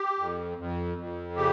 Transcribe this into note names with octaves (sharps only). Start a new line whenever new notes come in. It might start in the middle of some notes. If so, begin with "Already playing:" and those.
Already playing: G4
F2
F2
F2
C#3 G4